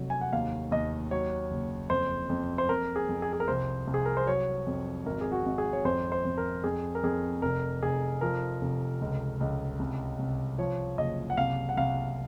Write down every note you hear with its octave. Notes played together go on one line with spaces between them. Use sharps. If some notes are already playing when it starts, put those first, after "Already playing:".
Already playing: F1 F#3
G#5
F#5
D#2 F5
D#2 D#5
F#3 C#5
F#1
F2 C5
F2
C5
F2 A#4
G#4
F2
G#4
G#4
A#4
C2 C5
C2
G#4
A#4
C5
F#3 C#5
F2
G#1 A#4
G#4
F#4
G#1
G#4
C#5
F2 C5
C5
F2
A#4
F2 G#4
A#4
F2 G#4
F1 A#4
F1 G#4
F3 A#4
F1
C#2
C#2
C2
C2
F3 C#5
F#1 D#5
F#5
C2 F5
F#5
C2 F5